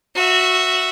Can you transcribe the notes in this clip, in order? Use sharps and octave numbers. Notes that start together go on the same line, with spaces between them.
F#4 E5